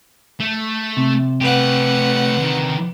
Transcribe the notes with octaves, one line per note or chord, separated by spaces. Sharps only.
A3
C3
A3 G4 B4 F#5
D3 D#3